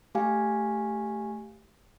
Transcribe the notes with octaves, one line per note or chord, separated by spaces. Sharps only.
A3 G4 F5 G#5